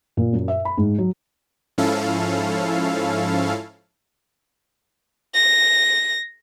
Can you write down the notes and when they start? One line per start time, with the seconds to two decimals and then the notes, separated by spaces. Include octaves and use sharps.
0.17 A#2
0.33 F#2
0.48 E5
0.65 B5
0.78 G#2
0.98 F#3
1.78 G#2 F3 C#4 E4 A4 F5
5.35 A#6